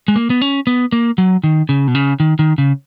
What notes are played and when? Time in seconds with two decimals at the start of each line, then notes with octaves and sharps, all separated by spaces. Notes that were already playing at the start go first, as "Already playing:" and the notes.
0.08 G#3
0.16 A#3
0.30 B3
0.42 C#4
0.67 B3
0.92 A#3
1.18 F#3
1.44 D#3
1.69 C#3
1.88 B2
1.95 C#3
2.20 D#3
2.39 D#3
2.58 C#3